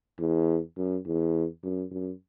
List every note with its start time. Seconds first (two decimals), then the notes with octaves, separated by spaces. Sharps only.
0.20 E2
0.77 F#2
1.06 E2
1.63 F#2
1.91 F#2